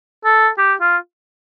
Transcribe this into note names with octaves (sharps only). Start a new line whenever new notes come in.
A4
G4
F4